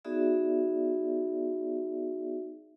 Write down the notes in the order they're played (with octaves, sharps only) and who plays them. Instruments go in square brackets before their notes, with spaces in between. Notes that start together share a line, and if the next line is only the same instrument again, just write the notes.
[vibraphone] B3 D#4 F#4 G#4 D5 E5